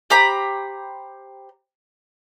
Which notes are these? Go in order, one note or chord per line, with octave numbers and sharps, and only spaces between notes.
G4 C5 A#5 B5